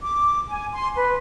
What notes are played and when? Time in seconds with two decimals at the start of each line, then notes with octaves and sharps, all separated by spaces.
0.01 D6
0.48 G#5
0.73 C6
0.96 B4